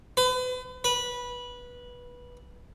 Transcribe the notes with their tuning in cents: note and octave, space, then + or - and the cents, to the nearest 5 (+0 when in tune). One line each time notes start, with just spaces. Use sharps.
B4 +40
B4 -15